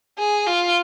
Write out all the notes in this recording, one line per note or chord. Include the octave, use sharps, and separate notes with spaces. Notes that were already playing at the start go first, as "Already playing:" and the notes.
G#4
F4